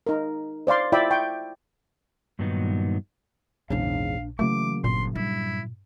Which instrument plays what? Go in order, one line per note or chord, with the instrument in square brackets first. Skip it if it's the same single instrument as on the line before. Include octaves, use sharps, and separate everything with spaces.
[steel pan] D#4 A#4
C5 D5 F5 C6
E4 F4 D5 E5 G5 B5
G5 C#6
[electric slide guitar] G2 A#2 D#3 F#3 B3 D#4
[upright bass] A#1 D4 [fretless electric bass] E2 G#2 C#3 [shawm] F5
[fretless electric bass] C#3 F#3 A#3 [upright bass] E3 [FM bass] A3 [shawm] D6
[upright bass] G1 [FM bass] A#2 [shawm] C6
[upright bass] G2 [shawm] E4